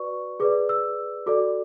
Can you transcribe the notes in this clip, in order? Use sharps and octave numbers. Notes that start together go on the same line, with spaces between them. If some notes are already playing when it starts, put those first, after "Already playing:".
Already playing: F#4 B4 D5 C#6
G#4 B4 D5 D6
E6
F#4 A4 D5 D6